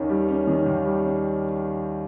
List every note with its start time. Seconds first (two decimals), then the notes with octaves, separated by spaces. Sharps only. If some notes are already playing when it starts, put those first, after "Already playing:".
Already playing: D#2 D#3 C#4
0.10 G3
0.28 C#4
0.47 D#3
0.66 D#2
0.85 G3
1.04 C#4